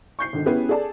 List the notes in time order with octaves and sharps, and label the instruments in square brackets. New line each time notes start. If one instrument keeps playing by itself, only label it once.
[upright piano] C#6 G6 C7
G#1 D3 D#3
B3 C#4 E4 G4 G#4 B4
G#4 A4 D5 A5